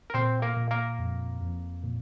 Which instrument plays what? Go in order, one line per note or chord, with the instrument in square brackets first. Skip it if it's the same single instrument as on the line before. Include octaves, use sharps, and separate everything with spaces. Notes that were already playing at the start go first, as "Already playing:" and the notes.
[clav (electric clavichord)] A#4
[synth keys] A#2 [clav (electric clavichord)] C4 C5
[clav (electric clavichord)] A#3 A#4
[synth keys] A#2
[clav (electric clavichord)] A#3 A#4
[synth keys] F2
F2
A#2